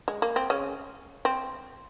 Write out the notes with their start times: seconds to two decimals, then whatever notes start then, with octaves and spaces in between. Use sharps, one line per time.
0.08 G#3
0.22 A#3
0.36 C4
0.50 C#3 C#4
1.25 C4